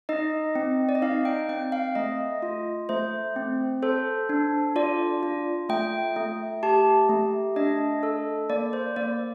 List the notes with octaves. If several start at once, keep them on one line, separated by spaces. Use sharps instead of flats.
D#4 D#5
C4
D5
D#5
D#4 F5
G5
C4 G5
F5
A3 D#5
F4
A3 C5
C4
A4 C5
D4
F4 D5
F4
A3 G5
A3
G4 A5
A3
D4 D#5
A4
A#3 D5
C5
A#3 D5